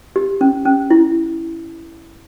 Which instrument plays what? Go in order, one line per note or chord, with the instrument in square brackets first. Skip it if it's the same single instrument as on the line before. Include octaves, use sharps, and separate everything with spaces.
[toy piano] G4
C#4
C#4
E4